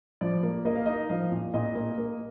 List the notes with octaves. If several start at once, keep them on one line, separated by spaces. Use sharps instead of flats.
F3 D5
A#3
A#3 D#5
F5
D#4 D#5
F3 F5
A#2
A#2 D#5
A#3
A#3